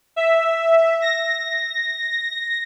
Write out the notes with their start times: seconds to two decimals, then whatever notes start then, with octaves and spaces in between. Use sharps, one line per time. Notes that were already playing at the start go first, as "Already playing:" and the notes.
0.16 E5
1.02 A#6